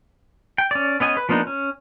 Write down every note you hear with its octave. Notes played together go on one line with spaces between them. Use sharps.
G5
C#4 D5
B3 C#4 D#5 G#5
B4
F3 A#3 B3 D4 D#4
C#4